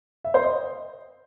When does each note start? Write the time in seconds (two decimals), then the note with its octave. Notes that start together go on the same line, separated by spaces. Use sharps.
0.24 E5
0.34 C5
0.44 D#5